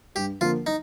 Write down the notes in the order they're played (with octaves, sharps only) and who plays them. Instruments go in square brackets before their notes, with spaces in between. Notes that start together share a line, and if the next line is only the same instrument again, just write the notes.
[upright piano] G2 [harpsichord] G4
[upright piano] D3 F3 A#3 [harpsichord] F4
[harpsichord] D#4